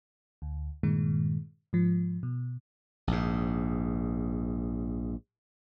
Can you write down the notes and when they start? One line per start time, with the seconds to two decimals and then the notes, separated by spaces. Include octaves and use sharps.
0.42 D2
0.83 G2 A#2 D#3 G#3
1.73 G#2 F3
2.23 B2
3.07 A#1 G#2